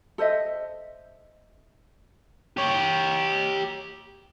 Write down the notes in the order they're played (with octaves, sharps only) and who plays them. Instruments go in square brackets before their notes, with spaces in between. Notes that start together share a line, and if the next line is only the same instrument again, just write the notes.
[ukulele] A4 C5 D#5 E5
[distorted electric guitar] G4 C#5